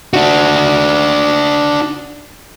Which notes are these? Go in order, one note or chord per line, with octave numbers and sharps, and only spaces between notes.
D4 F#4